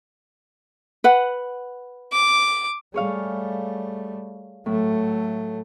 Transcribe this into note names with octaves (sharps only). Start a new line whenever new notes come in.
B4 F#5
D6
G3 A3 G#4 C#5 F5
A2 F#3 A3